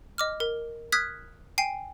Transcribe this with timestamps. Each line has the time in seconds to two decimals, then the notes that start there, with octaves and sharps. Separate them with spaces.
0.18 D#5 D6 F6
0.40 A#4
0.92 D#6 F6 F#6 G#6 B6
1.58 G5 G#5 C7